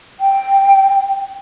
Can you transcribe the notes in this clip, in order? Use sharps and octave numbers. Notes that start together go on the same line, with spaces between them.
G5